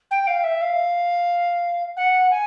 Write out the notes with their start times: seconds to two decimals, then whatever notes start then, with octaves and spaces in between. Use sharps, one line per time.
0.11 G5
0.27 F5
0.44 E5
0.61 F5
1.97 F#5
2.31 G#5